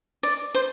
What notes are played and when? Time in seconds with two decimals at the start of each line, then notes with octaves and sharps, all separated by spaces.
0.23 D5
0.55 C5